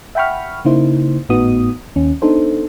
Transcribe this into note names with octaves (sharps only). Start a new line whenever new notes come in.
E5 F#5 G5 B5 C#6 F6
C#3 A#3 D#4 E4 C5
G#1 A2 B3 D#4 F#4 D#6
D#2 C#4
B3 D4 D#4 A4 C5